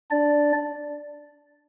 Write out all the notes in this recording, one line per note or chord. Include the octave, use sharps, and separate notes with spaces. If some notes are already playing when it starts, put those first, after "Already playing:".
D4 D5